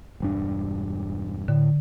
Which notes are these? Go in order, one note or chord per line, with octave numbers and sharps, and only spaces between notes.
E1 G2 D4
A2 D3